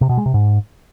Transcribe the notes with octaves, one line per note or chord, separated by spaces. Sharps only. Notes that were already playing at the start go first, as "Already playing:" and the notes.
C3
B2
G#3
C3
G#2